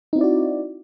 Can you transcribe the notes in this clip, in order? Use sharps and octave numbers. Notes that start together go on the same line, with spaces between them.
C4 D#4 E4 F#4 D5